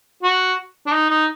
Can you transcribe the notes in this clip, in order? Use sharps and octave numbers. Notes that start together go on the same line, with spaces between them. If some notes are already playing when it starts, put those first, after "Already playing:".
F#4
D4
D#4
D#4